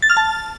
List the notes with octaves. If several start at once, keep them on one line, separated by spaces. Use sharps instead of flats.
A6
F6
A5